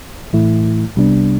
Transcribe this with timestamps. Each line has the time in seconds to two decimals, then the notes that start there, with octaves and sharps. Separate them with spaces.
0.33 A2 E3 A3 E4
0.96 C2 C3 G3 B3 D4